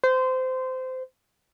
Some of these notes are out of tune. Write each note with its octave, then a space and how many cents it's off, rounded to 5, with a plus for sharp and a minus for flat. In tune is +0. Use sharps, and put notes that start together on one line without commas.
C5 -20